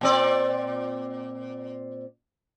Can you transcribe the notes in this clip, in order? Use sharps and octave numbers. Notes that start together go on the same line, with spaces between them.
A#2 C4 D5